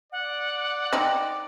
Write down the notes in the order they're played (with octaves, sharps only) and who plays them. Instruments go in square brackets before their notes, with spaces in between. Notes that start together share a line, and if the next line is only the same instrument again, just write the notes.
[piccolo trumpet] D5 [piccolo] F#5
[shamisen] C4 D#4